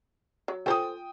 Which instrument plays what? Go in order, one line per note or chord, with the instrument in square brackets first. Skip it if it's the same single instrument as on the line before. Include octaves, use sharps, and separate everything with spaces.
[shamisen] F#3
[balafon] F4 G#5 [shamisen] A4 C5 [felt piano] G5 D#6